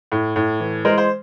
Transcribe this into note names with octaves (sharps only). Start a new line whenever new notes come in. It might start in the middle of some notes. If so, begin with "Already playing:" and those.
A2
A2
E3
G#3 A#4 C5
C5